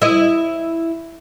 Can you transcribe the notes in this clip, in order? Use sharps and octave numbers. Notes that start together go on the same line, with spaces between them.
E4 D#5